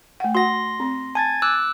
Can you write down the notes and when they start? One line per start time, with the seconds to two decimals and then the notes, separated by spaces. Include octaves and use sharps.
0.20 A3 F#5
0.35 F#4 F#5 C6 A#6
0.80 C4
1.15 G#5 A5 G#6 A6
1.42 D6 E6 F#6